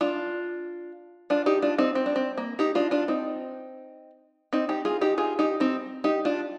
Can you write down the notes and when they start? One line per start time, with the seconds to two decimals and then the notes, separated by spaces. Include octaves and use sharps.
0.01 D4 F4
1.30 D4 F4
1.46 D#4 G4
1.62 D4 F4
1.78 C4 D#4
1.95 C4
2.06 D4
2.16 C4
2.37 A#3
2.59 D#4 G4
2.75 D4 F4
2.91 D4 F4
3.08 C4 D#4
4.53 C4 D#4
4.69 D#4 G4
4.85 F4 G#4
5.01 D#4 G4
5.18 F4 G#4
5.39 D#4 G4
5.60 C4 D#4
6.04 D#4 G4
6.25 D4 F4